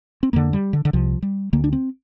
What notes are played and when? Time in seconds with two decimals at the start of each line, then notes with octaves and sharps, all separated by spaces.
0.23 C4
0.33 F2 D3 A#3
0.53 G3
0.73 D3
0.85 D3
0.93 C2 C3 F3
1.22 G3
1.53 D2 D3 A#3
1.64 D4
1.73 C4